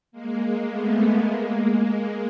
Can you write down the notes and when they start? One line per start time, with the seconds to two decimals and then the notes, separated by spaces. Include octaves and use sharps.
0.12 G#3 A#3
0.67 A3 B3
1.22 G#3 A#3